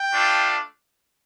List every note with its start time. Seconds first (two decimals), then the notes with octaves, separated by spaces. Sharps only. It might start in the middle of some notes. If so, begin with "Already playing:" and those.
Already playing: G5
0.12 A3 D4 F4